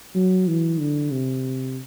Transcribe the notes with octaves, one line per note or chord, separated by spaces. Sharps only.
F#3
E3
D3
C3